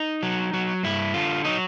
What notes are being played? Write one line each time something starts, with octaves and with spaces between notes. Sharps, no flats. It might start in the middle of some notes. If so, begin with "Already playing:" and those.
Already playing: D#4
F#3
F#3
G2 E4
D3 F4
F#3 D#4